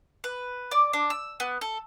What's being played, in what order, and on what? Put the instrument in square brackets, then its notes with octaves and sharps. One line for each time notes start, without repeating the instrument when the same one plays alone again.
[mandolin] B4
D5
D4
E6
B3
A4